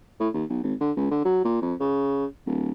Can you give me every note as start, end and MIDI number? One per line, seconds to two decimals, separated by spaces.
0.20 0.29 45
0.34 0.44 39
0.49 0.59 35
0.63 0.74 32
0.81 0.92 50
0.97 1.09 37
1.11 1.20 50
1.25 1.41 54
1.45 1.61 46
1.62 1.74 41
1.80 2.26 49
2.47 2.71 26